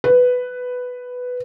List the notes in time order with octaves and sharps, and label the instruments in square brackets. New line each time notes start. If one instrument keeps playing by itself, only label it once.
[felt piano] B4